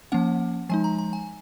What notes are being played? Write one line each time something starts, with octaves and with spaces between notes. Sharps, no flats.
F3 A#3 C#4 F#5
F3 G#3 D#4 G#5
A#5
A#5
G#5